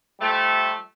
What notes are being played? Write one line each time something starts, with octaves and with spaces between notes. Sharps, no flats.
F3 G3 A3